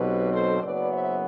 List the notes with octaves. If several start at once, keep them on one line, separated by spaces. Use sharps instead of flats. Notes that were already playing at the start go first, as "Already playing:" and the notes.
Already playing: B1 B2 F#3 C4 G4 B4
A4 C5
F#1 F#2 F#3 B3 B4 D5
C5 E5